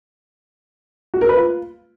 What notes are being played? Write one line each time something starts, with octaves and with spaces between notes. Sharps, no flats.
F#4
A#4
B4
F4